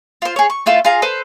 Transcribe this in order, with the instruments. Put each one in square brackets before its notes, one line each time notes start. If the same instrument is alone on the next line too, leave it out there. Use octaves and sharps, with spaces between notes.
[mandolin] F4 C5
G#4 C#5
C#6
A3 E4 F4 A4
F4 G#4 F5 A#5
A4 B4 C5